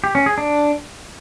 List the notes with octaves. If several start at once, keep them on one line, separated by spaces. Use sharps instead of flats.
G4
C#4
G#4
D4